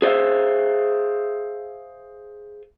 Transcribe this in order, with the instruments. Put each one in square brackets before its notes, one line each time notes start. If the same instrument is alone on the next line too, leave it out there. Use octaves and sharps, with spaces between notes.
[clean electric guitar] G#4 C5 D5 E5 F5